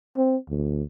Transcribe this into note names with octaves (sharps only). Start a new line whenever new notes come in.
C4
D2